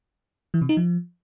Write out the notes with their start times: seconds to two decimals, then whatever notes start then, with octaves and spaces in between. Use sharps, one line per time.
0.54 E3
0.62 C3
0.69 D#4
0.77 F3